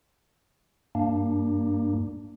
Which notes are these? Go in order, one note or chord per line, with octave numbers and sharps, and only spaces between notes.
G2 A#3 D4